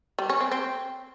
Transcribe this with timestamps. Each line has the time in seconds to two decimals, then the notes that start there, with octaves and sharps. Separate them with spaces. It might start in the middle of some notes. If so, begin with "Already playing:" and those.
0.19 G3
0.30 C#4
0.41 C4
0.52 C4